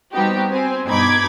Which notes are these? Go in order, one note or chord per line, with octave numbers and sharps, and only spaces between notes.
G3 B3 C4 D#4 F#4 G4
C4 G#5
G2 B2 D#4 B5 D6 G#6